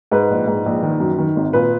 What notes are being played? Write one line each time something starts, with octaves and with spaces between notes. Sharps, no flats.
G#2 B4
A#1
G#2
A#1
D#3
F#2
D#3
G#1
A#2 B4